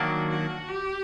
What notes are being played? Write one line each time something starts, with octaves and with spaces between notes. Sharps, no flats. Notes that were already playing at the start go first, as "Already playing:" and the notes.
Already playing: D#3 F#3 A#3 D4 F#4
F#4
G4